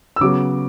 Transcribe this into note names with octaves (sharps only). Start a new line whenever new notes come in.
E6
C#3 F#3 B3 D6